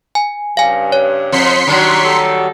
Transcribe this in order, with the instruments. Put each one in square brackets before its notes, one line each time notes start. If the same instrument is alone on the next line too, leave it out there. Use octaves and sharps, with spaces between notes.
[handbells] G#5
[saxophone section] G2 C#3 [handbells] F5 G#5
[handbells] C#5
[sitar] F2 [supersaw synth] C6 B6 C#7
[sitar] D#3 F#3 [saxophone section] G3 D4
[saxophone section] G3 A4